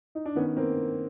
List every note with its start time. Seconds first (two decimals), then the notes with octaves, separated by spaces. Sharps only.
0.15 D#4
0.26 D4
0.35 D#3 B3 C#4
0.57 A#3 C4